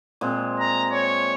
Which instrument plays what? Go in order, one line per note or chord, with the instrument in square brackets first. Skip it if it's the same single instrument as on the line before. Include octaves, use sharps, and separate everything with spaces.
[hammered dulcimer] A#2 G#3 C4
[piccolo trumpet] A#5
C#5